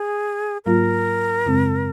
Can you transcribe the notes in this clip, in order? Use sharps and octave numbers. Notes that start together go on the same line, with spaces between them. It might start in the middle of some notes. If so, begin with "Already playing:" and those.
Already playing: G#4
G#2 F#3 A#3 F4 A#4
F#2 C#3 G#3 C4